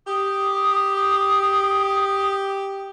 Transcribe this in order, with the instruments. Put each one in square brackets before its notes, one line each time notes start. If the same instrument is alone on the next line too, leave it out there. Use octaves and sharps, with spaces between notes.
[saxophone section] G4 [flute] D#6